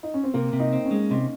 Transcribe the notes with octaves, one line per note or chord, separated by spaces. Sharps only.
D#4
C#4
C4
C3 A#3
C3
D#4
C4
C#4
G#3
C3 D#4